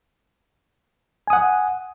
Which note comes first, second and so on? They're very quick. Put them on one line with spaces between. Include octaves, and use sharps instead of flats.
G#5 D#6 F#5